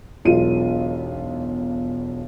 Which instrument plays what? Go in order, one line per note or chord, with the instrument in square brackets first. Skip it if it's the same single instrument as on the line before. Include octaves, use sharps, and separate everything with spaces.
[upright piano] E1 B1 F4 D#7